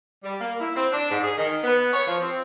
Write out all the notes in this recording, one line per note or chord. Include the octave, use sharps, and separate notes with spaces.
G3
A#3
E4
C4
D4
G#2
G#4
D#3
B3
C#5
F3
C4